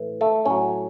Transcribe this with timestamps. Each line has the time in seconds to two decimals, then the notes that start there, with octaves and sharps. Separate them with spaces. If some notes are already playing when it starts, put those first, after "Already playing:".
Already playing: A2 E3
0.21 A3 A4
0.45 A2 F#3 C#4 C#5